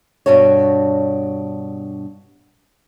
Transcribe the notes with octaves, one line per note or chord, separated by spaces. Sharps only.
G2 B2 D4 F#4 C#5